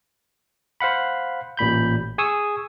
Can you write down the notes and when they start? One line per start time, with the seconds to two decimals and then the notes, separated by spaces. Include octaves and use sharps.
0.80 C5 F5 F#5 B5
1.57 A1 A#2 B5 G6
2.18 G#4 G#5 C#6 D#6 E6